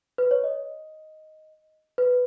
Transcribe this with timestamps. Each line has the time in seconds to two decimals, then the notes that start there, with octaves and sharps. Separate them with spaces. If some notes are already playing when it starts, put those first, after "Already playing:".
0.18 B4
0.31 C#5
0.44 D#5
1.98 B4